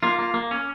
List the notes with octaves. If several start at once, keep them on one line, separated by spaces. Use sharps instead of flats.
A#3 F4
A#3
A#3
C#4